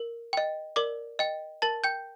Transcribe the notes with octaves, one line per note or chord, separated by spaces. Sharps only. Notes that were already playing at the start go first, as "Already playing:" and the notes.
Already playing: A#4
D#5 G5
A#4 D5 D6
D#5 G5
A#4 A5 A6
G5 G6